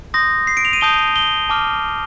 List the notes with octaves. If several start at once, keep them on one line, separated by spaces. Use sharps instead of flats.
C6 D#6 G6 A#6
C7
D7
F7
D#7
A5 D#6 G6 G7
G7
A5 D6 F6